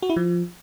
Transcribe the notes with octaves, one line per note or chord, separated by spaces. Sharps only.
F#4
E4
F3